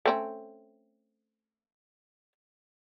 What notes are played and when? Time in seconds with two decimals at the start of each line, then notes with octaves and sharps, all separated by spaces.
0.06 A3 C4 C#4